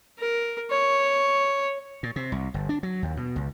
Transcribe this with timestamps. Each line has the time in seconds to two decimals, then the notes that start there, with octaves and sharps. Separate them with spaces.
0.19 A#4
0.71 C#5
2.03 A#2
2.16 C3
2.32 C2
2.54 G1
2.69 D4
2.83 F#3
3.03 D#2
3.17 B2
3.36 C#2